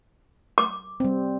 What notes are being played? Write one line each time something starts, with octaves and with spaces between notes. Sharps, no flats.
D6
G3 C4